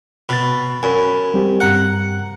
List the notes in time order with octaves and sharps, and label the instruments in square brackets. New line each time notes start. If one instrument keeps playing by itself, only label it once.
[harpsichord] B2 [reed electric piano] B5 A6
[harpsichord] F#2 [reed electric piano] G#5 B5
[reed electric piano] G3 C4 G4
[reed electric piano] G2 A#5 F#6 [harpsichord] F#5